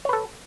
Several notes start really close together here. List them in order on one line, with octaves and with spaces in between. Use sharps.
C#5 B4 A4